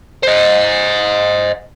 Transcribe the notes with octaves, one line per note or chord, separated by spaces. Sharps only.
C5 D#5